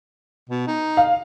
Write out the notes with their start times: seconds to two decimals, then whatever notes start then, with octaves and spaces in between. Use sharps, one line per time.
0.49 B2
0.67 D#4
0.97 F5